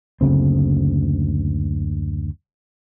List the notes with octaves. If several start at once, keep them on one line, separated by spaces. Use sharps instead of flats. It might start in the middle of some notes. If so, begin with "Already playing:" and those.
F#1 D2 C#3 C4